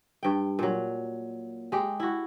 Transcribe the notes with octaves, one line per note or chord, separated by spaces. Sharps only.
G2 G5
A#2 F#3
G#3 G4
E4 F#4